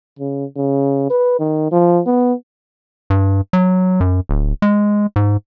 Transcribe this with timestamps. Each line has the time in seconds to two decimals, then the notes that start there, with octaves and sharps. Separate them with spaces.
0.19 C#3
0.57 C#3
1.10 B4
1.39 D#3
1.72 F3
2.06 B3
3.10 G2
3.53 F#3
4.00 F#2
4.29 D1
4.62 G#3
5.16 G#2